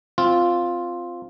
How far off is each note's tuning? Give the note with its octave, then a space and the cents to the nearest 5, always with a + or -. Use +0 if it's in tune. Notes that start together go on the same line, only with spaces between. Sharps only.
C4 +0 F4 +0